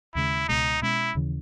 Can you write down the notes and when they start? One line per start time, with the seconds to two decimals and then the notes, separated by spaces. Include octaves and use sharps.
0.15 D#2 C#3 G#3 E4
0.49 C#2 B2 G#3 D#4
0.82 B2 G#3 C#4 E4
1.15 D#2 C#3 E3